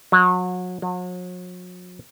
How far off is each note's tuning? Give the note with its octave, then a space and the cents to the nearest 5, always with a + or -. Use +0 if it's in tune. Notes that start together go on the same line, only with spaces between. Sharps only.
F#3 -30
F#3 -40